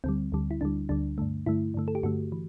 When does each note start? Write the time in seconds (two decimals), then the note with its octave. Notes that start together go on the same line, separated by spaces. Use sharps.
0.04 D2 D3 G3 C4
0.32 D2 D3 G3
0.51 E4
0.61 D2 D3 G3 D4
0.89 D2 D3 G3 D4
1.18 G2 D3 A3
1.46 G2 D3 A3 E4
1.74 G2 D3 A3
1.88 A4
1.95 G4
2.03 G2 D3 A3 F#4
2.32 E3